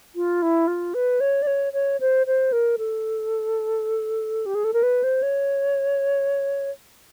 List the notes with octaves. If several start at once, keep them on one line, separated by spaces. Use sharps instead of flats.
F4
E4
F4
B4
C#5
D5
C#5
C#5
C5
C5
A#4
A4
G4
G#4
A4
A#4
B4
C5
C#5